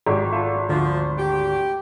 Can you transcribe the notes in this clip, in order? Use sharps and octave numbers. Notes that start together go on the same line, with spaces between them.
G#1 G#3 G4
F4 A4 E5
D2 D3 F3
G4